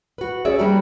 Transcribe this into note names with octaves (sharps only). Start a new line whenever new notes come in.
F#4 B4
C#4 G#4 D5 E5
G3 A#3 B3 D4 F#4 G4